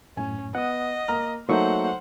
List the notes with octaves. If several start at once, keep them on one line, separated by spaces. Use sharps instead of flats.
F#2 A2 C#4 G#5
B3 D#5 F#5 D#6
A#3 A#5 F6
F#3 A3 A#3 D#4 C5 F#5 C#6